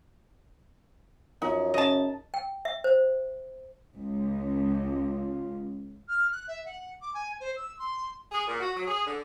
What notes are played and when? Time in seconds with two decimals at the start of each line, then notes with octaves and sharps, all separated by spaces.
1.42 F#2 F3 D#4
1.74 C#3 D#5 A5
2.34 G5
2.65 E5
2.84 C5
3.97 C#2
4.93 F4
6.08 F6
6.31 F#6
6.47 E5
6.65 F#5
7.01 D6
7.13 G#5
7.40 C5
7.56 E6
7.78 C6
8.32 G#4
8.47 A#2
8.60 F#4
8.76 F#3
8.88 G#4
9.06 D3